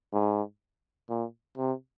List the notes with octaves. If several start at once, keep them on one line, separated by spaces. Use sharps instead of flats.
G#2
A#2
C3